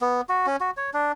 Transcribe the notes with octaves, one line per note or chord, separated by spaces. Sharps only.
B3
F#4
C#4
F#4
C#5
D4